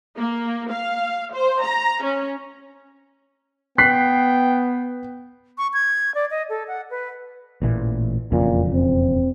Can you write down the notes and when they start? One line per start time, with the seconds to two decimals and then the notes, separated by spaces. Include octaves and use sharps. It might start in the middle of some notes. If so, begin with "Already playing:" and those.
0.17 A#3
0.72 F5
1.34 C5
1.63 A#5
2.03 C#4
3.78 B3 G5 F#6 B6 C7
5.58 C#6
5.74 G#6
6.15 D5
6.31 D#5
6.49 A4
6.68 F#5
6.91 B4
7.62 A1 A#2 E3
8.32 E1 F2 A#2 C#3
8.73 C4